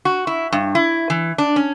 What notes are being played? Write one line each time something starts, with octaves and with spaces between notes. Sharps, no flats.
F#4
E4
G2
E4
E3
D4
C#4